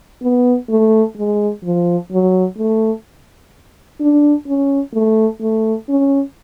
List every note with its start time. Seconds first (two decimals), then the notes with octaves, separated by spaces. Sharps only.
0.23 B3
0.70 A3
1.17 G#3
1.64 F3
2.12 F#3
2.58 A3
4.00 D4
4.47 C#4
4.94 A3
5.41 A3
5.89 C#4